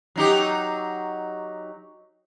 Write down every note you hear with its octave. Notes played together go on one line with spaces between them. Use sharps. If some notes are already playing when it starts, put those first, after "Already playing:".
F#3 D#4 G4